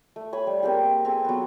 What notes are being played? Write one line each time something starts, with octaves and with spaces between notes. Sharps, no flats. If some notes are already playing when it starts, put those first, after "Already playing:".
A3
C#5 B5 D#6
G3
A#3 C4 G4 G#4
C4 G#4 A4
F#3 B3